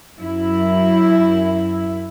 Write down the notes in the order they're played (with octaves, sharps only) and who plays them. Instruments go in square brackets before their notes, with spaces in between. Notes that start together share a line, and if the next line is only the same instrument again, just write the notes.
[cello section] F#2 E4